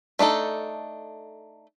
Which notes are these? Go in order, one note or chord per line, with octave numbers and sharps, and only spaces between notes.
A3 D4 D#4 A4